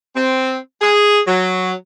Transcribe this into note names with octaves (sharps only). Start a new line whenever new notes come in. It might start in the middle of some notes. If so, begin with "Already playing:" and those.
C4
G#4
F#3